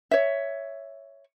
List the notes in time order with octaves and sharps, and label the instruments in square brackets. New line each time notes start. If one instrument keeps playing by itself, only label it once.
[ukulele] C#5 E5